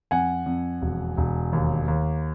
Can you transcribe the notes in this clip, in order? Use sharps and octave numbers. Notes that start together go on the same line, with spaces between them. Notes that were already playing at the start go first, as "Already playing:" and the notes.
F2 F#5 G#5
F2
E1
E1
D#2
D#2